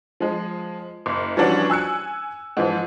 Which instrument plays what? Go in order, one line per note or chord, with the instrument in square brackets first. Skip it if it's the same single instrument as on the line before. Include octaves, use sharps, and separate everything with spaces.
[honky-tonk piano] F3 G#3
F#1
E3 F3 G3 C#4 D4 F#4
G#5 E6 F#6 C#7
G#2 E3 F3